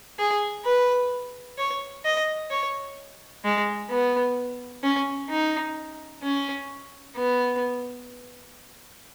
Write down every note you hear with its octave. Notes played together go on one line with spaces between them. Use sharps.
G#4
B4
C#5
D#5
C#5
G#3
B3
C#4
D#4
C#4
B3